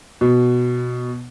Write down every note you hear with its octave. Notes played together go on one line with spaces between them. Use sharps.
B2